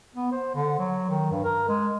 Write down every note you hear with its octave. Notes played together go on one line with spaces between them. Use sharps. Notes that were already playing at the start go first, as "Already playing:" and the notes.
B3
C5
D3
F#3
D#3
G2
A#4
G#3